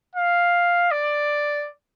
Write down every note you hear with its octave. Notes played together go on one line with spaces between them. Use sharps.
F5
D5